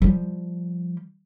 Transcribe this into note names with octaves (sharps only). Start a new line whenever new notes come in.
F3 G3